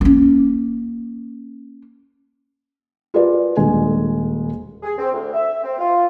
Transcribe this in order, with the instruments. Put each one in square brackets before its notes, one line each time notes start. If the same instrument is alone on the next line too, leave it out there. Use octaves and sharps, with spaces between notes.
[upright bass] A#3 C#4
[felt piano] F4 G#4 A#4 B4 D5
D#1 D2 G#3 G#5
[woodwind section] G#4
C4
D2
E5
C4
F4